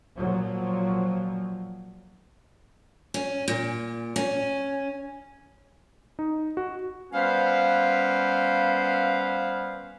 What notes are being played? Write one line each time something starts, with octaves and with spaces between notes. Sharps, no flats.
A#2 F3 F#3
C#4
A#2
C#4
D#4
F#4
G3 B3 C#4 B4 C5 F5